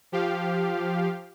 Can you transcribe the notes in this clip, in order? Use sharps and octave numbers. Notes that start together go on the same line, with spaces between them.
F3 G4 F5